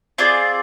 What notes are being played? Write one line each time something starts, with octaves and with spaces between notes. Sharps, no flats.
C4 F4 G#4 D5